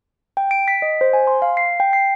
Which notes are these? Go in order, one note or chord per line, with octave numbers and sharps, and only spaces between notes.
G5
D7
B6
D#5
C5
G#5
C6
F5
C7
G5
C7